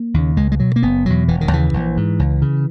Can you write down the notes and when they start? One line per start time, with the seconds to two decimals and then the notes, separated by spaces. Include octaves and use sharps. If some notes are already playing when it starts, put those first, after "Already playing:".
Already playing: A#3
0.14 D#2 C#3
0.37 C#2 G#3
0.52 G#3
0.60 B2 F#3
0.76 A#3
0.83 F#1 B3
1.06 E2 B2 F#3
1.28 E1 E3
1.41 D#3
1.51 D#2 C#3 E3
1.73 A#1
1.97 G#2
2.19 C#2
2.42 C#3